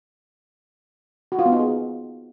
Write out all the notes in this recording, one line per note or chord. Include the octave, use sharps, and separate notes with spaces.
F#4
F4
B3
D#4
G#4